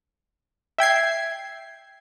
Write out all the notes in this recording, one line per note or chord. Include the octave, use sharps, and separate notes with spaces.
E5 G5 G#6 C7